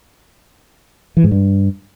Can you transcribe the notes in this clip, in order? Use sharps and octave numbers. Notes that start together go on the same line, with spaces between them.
E3
G#2
G2